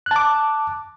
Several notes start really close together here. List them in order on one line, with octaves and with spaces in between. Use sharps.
F#6 A5 D6